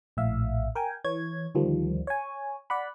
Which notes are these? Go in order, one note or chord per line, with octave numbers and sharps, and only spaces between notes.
A#1 A2 E5 F5
A#4 G5 G#5
E3 C#5 G#6
D2 D#3 F3 G3
C#5 G#5
D5 F#5 B5